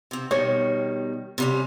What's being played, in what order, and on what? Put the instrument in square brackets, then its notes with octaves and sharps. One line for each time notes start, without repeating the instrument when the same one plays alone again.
[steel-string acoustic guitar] C3 C4
[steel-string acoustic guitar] B2 D#3 G3 [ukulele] C#5
[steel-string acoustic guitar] C3 G3 C#4